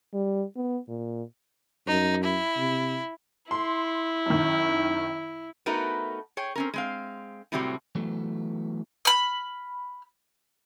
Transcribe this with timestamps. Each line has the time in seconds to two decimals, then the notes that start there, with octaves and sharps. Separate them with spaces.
0.14 G3
0.56 B3
0.88 A#2
1.88 F#2 D#4
2.24 E4
2.57 C3
3.51 E4 C6
4.26 F#2 D#3
5.66 A3 B3 D#4 F#4 A#4 B4
6.37 G#4 C#5 G5
6.56 C4 C#4 A#4
6.74 G#3 C4 F5
7.52 A2 C3 F#3 G3 C4 F#4
7.95 E3 F#3 A3 B3
9.05 B5 F6